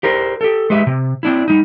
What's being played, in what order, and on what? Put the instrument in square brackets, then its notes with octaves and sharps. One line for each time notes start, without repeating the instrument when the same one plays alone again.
[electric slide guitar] G4 A#4 C5
G4 A4
G#3 G4 B4 E5
C3
C4 D4 E4
G3 D#4